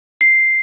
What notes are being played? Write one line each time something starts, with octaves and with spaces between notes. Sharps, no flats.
C7